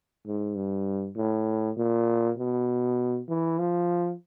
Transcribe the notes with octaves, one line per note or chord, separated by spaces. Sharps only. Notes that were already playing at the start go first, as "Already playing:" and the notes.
G#2
G2
A2
A#2
B2
E3
F3